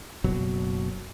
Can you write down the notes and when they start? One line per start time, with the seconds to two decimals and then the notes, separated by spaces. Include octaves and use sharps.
0.24 F#1 B2 F#3